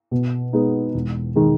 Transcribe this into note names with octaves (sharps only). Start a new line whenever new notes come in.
B2
G#3 B3 D#4
E1
D#3 G#3